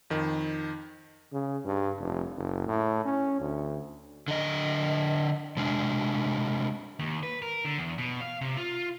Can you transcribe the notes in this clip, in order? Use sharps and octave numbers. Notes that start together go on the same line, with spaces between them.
F2 D#3
C#3
G2
F1
F#1
A2
C#4
D2
D3 D#5
C3 G#3 D4
D#2
B4
A#4
D3
E2
B2
F5
C3
F4